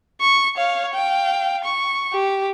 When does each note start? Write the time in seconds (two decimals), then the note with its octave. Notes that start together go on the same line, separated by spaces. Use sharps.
0.21 C#6
0.57 C#5 F5
0.94 F5 G5
1.64 C#6
2.13 G4